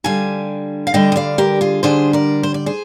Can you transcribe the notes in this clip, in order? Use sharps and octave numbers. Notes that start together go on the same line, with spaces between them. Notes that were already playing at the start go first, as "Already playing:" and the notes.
D3 G3 D4 F5 G#5
F5
D3 G3 D4 D#5 G5
D#5
D5 F5
G4 A#4
F4 G#4
D3 G3 D4 G#4 C5
A#4 D5
C5
D5
G#4 C5